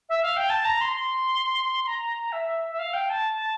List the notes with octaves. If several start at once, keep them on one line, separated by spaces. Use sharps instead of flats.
E5
F5
G5
A5
A#5
C6
C6
A#5
E5
E5
F5
G5
A5